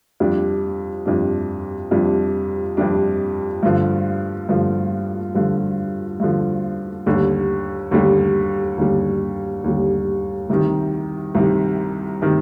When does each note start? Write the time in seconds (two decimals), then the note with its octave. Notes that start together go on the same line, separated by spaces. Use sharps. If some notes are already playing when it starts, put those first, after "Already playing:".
0.20 F2 C3 G3 D4
1.06 F2 C3 G3 D4
1.91 F2 C3 G3 D4
2.77 F2 C3 G3 D4
3.63 G2 D3 F3
4.49 G2 D3 F3
5.35 G2 D3 F3
6.20 G2 D3 F3
7.06 D#2 D3 G3
7.91 D#2 D3 G3
8.78 D#2 D3 G3
9.64 D#2 D3 G3
10.50 C2 C3 D#3
11.35 C2 C3 D#3
12.22 C3 D#3